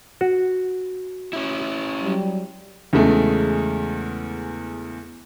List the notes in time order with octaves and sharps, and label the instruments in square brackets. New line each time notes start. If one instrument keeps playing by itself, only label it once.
[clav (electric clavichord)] F#4
[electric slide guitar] C#4 E4
[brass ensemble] F#3 G3
[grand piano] E2 C#3 G#3 A3